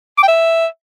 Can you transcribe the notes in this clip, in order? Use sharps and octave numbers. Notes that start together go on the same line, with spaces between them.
D6
G5
E5